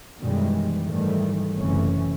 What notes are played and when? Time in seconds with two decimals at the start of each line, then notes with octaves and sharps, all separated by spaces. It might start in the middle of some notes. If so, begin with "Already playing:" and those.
0.20 F#2 B2 D#3 E3 G3 G#3
0.84 G#2 D#3 E3 G3 A3
1.56 F#1 C3 E3 A3 C#4